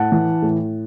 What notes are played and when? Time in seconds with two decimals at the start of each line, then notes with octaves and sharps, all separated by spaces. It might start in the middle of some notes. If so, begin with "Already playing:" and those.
Already playing: A2 F#5 A5
0.12 E3
0.42 A2